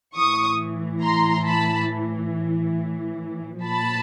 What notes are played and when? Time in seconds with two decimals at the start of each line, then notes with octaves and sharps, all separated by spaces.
0.15 A2 E3 C#6 D#6
1.02 A#5 C6
1.45 A5 B5
3.64 A#2 F3 A5 B5